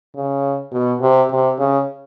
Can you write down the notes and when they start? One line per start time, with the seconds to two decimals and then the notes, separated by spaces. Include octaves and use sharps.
0.16 C#3
0.72 B2
1.02 C3
1.31 C3
1.58 C#3